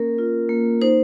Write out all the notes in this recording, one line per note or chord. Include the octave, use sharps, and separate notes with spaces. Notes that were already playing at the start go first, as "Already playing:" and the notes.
Already playing: A#3 C#4 A#4
F4
A#3
D#4 C5